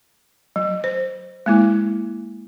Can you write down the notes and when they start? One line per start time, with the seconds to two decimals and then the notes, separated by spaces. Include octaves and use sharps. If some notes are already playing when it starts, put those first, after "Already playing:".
0.56 F#3
0.84 C5
1.46 G#3 A#3 E4